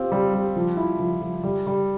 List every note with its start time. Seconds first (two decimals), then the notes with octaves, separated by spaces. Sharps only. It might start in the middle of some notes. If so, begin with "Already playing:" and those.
Already playing: C4 F4 G4
0.12 G3
0.34 G3
0.56 F3
0.77 E4
0.99 F3
1.22 F3
1.44 G3
1.67 G3